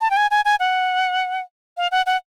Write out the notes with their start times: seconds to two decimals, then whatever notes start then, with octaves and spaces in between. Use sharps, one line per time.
0.01 A5
0.10 G5
0.17 G#5
0.31 G#5
0.45 G#5
0.60 F#5
1.77 F5
1.91 F#5
2.06 F#5